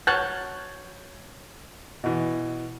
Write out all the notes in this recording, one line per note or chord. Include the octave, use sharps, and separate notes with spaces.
F#3 F#5 A5 F6 G6 G#6
B2 E3